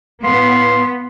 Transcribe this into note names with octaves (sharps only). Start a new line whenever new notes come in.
A2 B3 F5 C6